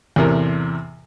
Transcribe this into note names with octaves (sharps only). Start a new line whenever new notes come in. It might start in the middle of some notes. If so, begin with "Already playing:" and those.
E2 A2 C3 A#4